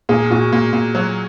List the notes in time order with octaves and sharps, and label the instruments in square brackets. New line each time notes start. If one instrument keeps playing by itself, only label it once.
[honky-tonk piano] A#2 [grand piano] G#4
[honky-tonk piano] A#2 [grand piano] F#4
[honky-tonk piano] A#2
A#2
F#3